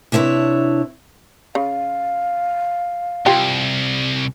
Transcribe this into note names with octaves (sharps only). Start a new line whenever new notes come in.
C3 D4 E4 B4 C#5
C#3 F5
C2 F4 G4